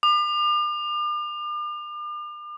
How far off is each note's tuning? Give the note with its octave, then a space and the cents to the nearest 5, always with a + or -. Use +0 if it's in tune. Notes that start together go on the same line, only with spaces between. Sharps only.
D6 +40